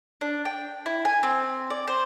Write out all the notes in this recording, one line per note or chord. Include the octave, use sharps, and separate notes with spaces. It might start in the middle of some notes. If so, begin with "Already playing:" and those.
D4
G5
E4
G#5
C4
D5
C5